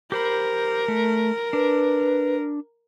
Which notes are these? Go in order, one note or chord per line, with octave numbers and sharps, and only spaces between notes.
G4 A#4 C5 B5
A3
D4 B4